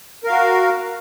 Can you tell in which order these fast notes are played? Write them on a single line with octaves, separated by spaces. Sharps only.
A#4 F5 F#4